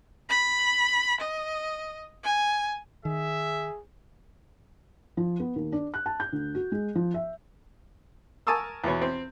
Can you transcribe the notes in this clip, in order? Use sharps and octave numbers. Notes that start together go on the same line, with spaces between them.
B5
D#5
G#5
D#3 G#4 E5
F3
B3
D#2
D4
F#6
A5
G6
D2
F#4
G#3
F3
E5
A#4 G#5 A5 C#6 D#6 E6
E2 B2 B3 C#5
C4